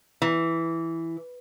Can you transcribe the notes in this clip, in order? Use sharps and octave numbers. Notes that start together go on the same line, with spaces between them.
E3